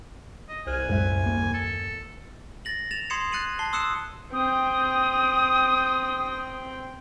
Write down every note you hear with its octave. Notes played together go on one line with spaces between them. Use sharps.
D#5
C2 C5 G#5 F6 F#6
F#2 A2 G#3 E5
D#2 A#3
A4
A6 A#6 F#7
A6 E7 F7
C6 D#6 G#6 C7 C#7 E7
F#6 A6 C#7 D#7 F#7
A5 C7 G7
C6 D#6 E6 F#6 C#7 E7
C4 G5 D#6